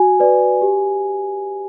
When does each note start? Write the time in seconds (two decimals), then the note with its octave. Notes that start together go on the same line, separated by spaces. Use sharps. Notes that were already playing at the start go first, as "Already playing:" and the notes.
Already playing: F#4 G#5
0.19 B4 D5
0.62 G4